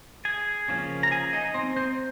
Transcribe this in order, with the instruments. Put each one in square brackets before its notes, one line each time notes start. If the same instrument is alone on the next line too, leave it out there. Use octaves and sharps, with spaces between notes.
[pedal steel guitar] G#4 G#5
C#3 F3 A#3 C#4
A#5
G#4 G#5
D#4 D#5
C4 C5
C4 C5